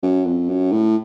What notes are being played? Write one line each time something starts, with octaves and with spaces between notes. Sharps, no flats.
F#2
F2
F#2
A2